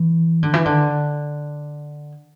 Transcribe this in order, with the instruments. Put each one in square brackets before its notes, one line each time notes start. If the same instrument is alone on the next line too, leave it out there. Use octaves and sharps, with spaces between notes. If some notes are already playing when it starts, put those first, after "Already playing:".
Already playing: [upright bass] E3
D3
E3
D3